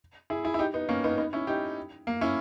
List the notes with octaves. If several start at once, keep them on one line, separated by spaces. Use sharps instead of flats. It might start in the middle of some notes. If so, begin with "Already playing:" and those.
E4 G#4
E4 G#4
E4
D#4 G4
B3 D#4
A#3 C#4
B3 D#4
B3 D#4
C#4 E4
D#4 G4
A#3
C#4 E4